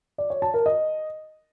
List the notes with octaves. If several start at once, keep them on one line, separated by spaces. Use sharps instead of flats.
D5
C#5
A5
A#4
D#5